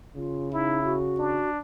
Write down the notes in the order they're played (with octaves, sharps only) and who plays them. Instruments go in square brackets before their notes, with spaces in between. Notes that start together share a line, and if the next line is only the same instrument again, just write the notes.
[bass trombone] C#3 [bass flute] F4
[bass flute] D#4 [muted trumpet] E4
[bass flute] F#4
[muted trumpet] D4